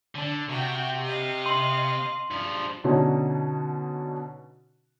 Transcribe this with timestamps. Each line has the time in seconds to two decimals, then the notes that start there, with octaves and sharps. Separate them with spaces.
0.15 D3 D4
0.49 C3 F#4 G5
1.05 D#5 F5
1.46 C6 F#7
2.31 G2 F3
2.84 B2 D3 C#4 D#4 F#4